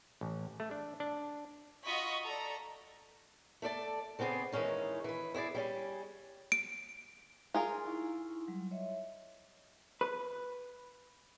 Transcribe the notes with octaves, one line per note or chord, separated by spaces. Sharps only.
A1
A3
D4
D4
F4 F#4 D#5 B5 C#6
A4 D5 A#5
A3 A4 D5 A5
C#3 B3 C4 G#4 D5
D#3 E3 G#3 C#4 D#4
E3 B4
E4 G#4 C5 D5
G3 C#4 G#4
D7
F4 G#4 A#4
D#4 E4 C#6
F#3 G3
C#5 D#5 E5
B4